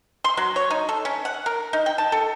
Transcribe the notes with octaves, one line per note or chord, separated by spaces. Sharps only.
C6
F#3
C#5
D#4
A4
C#4
F#5
A#4
D#4
G5
A5
A4